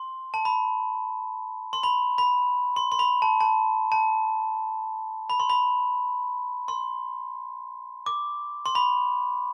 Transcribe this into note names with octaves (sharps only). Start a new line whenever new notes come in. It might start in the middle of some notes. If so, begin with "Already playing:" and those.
Already playing: C6
A5
B5
C6
B5
B5
C6
C6
B5
A5
A5
A5
B5
C6
B5
C6
D6
C6
B5